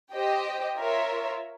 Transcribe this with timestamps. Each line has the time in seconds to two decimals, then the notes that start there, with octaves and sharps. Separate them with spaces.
0.13 G4 C5 D#5 G5
0.77 F4 A#4 C#5 E5